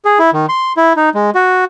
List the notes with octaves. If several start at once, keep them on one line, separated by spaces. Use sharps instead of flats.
G#4
E4
D#3
C6
E4
D#4
G#3
F#4